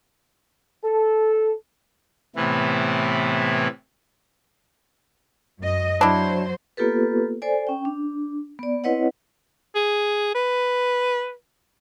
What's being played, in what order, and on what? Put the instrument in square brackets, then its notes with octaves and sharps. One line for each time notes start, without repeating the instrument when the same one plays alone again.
[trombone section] A4
[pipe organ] A2 C3 E3 B3 E4
[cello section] F#2 D#5
[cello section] F#3 C5 [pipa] D4 E4
[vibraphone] A#3 B3 F4 G4 A4 B4
A4 C5 D5 G#5
C#4 G5
D4
B3 D5
C4 E4 B4 C#5 D#5 F#5
[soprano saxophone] G#4
B4